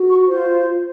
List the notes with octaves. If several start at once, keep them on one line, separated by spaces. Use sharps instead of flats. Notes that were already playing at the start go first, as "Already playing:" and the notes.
Already playing: F#4
C#6
F4 C5